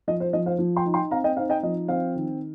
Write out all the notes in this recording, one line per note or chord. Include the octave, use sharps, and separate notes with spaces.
F3 D#5
C5
F3 D#5
C5 F5
F3
G5 C6
D#4
G5 C6
C4 F5 A#5
D#5 G5
D#4 C5 F5
D#5 G5
F3 D#5
C4 C5 F5
D#3